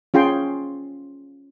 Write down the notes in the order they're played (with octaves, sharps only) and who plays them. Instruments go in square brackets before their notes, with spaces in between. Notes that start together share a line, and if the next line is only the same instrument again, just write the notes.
[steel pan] C#4 F4 G#4 G5 C6